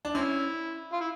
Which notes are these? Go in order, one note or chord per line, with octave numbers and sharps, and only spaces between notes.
D4
C4 C#4 E4
F4
E4